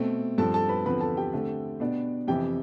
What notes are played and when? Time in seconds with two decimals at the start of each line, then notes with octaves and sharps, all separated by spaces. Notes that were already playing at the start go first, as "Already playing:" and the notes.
Already playing: B2 A3 C4
0.38 G2 F3 C4 A4 A5
0.54 A4 A5
0.69 B4 B5
0.85 E2 D3 F3 C4 B4 B5
1.01 A4 A5
1.17 G4 G5
1.33 D3 A3 C4
1.80 B2 B3 D4
2.27 F2 C3 E3 G4 G5